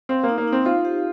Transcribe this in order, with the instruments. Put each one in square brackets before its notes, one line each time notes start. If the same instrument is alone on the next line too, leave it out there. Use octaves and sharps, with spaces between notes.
[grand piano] C4 [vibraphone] F5
[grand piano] A#3
[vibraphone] D#4
[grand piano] A#3
[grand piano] C4 [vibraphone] D#4
[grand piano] F4 [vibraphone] C5
[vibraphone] G4